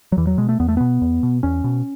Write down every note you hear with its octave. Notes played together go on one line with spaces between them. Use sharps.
F#3
E2 E3
F#3
B2 G#3
A3
E2 B3
A3
B2 B3
E2
B2
E2 C#4
B2